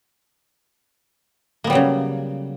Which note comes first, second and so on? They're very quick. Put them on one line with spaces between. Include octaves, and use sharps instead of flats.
A#3 B3 G3 F#3 C#3